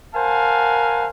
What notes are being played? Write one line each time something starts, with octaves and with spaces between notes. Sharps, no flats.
A#4 C5 F5 F#5 G#5 A5